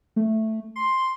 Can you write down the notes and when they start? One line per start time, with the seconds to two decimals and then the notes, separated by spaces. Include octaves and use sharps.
0.16 A3
0.76 C6